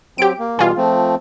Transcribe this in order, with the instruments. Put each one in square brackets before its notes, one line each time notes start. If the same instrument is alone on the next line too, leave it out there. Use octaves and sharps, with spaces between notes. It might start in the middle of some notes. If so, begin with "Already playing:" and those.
[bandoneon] F#3 C4 [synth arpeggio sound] G4 D7
[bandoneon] A#3
[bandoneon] B2 E3 G3 [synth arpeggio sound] F4 G#4
[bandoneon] F3 A3 C4